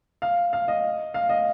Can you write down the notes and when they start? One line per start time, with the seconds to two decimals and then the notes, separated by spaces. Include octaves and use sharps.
0.22 F5
0.53 F5
0.68 D#5
1.14 F5
1.29 D#5